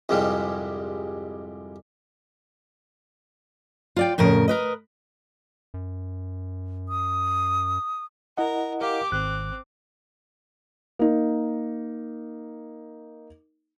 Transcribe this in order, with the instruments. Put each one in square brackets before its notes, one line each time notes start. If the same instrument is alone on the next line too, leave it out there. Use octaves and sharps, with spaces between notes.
[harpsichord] C2 F2 G#2 G3 G#3
[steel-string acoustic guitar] F4 D5 G5
F2 A2 C#3 A#4
A#4 B4 D#5
[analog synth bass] F#2
[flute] D#6
[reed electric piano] E4 D#5 F#5 [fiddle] A#4
[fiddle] G4 [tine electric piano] A#4 F5 [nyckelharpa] D6
[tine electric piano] G#1 [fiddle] C4 [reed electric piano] F#6
[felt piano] A#3 D#4